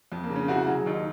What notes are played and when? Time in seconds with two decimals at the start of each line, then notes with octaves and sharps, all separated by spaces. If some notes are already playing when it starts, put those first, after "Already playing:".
0.12 F2
0.24 A#3
0.30 C#3
0.36 C#4
0.48 C2 F#4
0.67 F#3 G#4
0.86 D#2 D#4